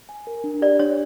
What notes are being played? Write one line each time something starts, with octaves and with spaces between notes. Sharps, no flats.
G#5
A#4
D4
G4 D5
D4 C#5